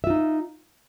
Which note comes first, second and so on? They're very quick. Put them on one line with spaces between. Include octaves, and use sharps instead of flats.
E5 F4 D#4